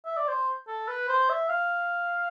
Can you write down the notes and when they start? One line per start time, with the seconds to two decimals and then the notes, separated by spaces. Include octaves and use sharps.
0.06 E5
0.17 D5
0.28 C5
0.67 A4
0.88 B4
1.08 C5
1.29 E5
1.49 F5